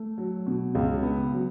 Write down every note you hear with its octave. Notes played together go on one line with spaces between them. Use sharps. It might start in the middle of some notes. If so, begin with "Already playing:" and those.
Already playing: A3
F#3
B2
C#2
B3
F#3